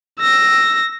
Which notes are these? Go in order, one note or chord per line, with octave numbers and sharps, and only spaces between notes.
E6 A#6